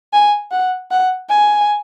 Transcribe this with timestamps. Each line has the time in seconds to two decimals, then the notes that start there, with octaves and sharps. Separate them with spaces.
0.13 G#5
0.51 F#5
0.91 F#5
1.30 G#5